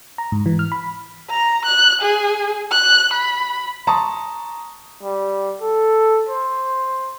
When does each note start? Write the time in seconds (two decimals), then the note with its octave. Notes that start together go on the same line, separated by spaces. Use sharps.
0.18 A#5
0.32 G#2
0.46 E3
0.59 F6
0.72 B5
1.30 A#5
1.65 F#6
2.02 G#4
2.72 F#6
3.14 B5
3.87 A5 A#5 C6 C#6 D#6
5.02 G3
5.61 A4
6.29 C5